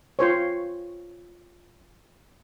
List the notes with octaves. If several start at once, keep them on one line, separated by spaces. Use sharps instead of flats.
F4 C5 C#5